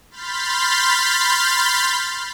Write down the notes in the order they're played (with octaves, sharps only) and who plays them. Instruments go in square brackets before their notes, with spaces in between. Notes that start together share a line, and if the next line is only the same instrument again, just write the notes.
[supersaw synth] B5 C6 F6 G6 A6 B6